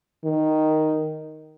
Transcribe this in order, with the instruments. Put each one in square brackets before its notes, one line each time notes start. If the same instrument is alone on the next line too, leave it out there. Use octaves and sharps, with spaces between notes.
[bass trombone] D#3